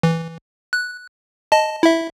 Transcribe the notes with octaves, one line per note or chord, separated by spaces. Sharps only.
E3
F#6
D#5 A5
E4 E5